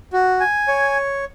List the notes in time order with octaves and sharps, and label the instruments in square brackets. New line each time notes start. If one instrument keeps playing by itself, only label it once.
[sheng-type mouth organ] F#4
G#5
C#5